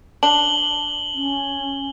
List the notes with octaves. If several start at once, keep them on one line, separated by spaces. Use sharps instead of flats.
D4 F#7 G7
C#4